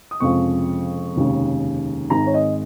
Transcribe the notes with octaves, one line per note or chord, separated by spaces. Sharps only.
D#6
F1 F2 C#3 F3 G#3 C#6
F1 D#2 C#3 G#3
G#1 G#2 D#3 G#3 A#5
C#5
D#5